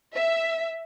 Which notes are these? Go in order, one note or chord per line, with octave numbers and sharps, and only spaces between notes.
E5